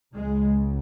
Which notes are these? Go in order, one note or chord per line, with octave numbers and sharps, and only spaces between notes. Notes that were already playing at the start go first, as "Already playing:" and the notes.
C#2 C#3 G#3